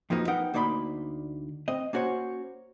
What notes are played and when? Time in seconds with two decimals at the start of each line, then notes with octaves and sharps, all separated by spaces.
0.10 F2 B2 F3 A#3 D#4
0.27 B3 D#4 A#4 F#5 G5
0.54 D2 A#3 D#4 D5 B5 C6
1.68 C4 D#5
1.93 A#3 C#4 F#4 C5 C#5